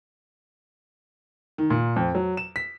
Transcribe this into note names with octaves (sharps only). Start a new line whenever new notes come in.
D#3
A#2
F2
F#3
E7
B6